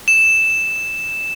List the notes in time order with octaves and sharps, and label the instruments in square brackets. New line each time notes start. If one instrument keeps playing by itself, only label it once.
[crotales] E7